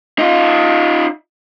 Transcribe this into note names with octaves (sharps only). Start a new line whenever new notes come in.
D#4 F4